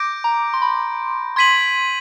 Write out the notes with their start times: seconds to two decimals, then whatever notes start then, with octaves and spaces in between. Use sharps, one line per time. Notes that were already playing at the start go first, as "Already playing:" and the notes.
Already playing: D6 G6 A#6 D7
0.24 A#5
0.54 C6
0.62 B5
1.36 C6 G#6 B6 D#7 F#7